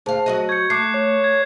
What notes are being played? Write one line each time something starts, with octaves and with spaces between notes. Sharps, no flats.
D2 G#4 C5 F5 A5
F#3 F#4 D#5
C#6 G6 G#6 C#7
A3 D6 F#6 C7
C#5
G#6